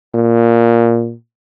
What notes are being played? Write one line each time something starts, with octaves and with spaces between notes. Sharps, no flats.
A#2